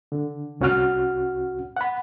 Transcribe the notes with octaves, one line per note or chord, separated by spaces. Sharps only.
D3
C2 C#4 F#4 F#5 F6
F#5 B5